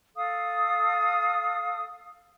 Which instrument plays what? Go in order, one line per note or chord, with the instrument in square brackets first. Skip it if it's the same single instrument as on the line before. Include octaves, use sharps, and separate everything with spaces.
[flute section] A4 F5 D#6